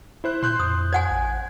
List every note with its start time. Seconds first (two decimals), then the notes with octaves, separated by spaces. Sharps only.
0.24 E4 C5 F#6
0.43 A#2 C6 F#6 G6
0.60 F2 D#6
0.93 C5 F#5 G#5 G#6
1.11 A1